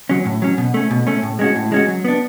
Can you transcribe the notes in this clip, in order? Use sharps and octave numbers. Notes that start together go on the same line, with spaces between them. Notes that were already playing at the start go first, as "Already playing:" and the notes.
F#3 C#4
A2
F#3 C#4
B2
A3 C#4
B2
A3 C#4
A2
G#3 C#4 F#4
A2
G#3 C#4 F#4
F#3
B3 D4